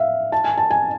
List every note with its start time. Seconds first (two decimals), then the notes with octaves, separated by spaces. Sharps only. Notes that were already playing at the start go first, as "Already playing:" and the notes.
Already playing: E5 F5
0.32 A5
0.44 G#5
0.58 A5
0.70 G#5